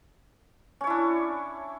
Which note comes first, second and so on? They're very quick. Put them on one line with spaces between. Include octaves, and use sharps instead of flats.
C#4 C#5 E4 D4